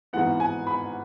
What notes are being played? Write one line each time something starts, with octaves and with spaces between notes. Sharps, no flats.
G#1 G#2 E3 B3 F#5
G#5
B5